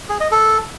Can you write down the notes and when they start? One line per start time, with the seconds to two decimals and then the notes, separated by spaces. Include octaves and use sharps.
0.09 G#4
0.20 D#5
0.31 A4